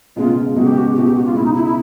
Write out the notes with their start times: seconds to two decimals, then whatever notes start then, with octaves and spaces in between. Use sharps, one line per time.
0.16 C#2 B2 G#3 F4
0.55 C#2 B2 G#3 F#4
0.66 G4
0.78 F#4
0.95 C#2 B2 G#3 G4
1.06 G4
1.15 F#4
1.25 F4
1.35 C#2 B2 G#3 E4
1.44 D#4
1.55 E4
1.65 E4